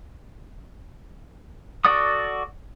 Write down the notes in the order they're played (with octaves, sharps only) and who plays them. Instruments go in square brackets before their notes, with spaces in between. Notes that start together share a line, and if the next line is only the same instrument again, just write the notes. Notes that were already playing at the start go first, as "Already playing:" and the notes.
[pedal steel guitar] F#4 A4 D5 F#5 D#6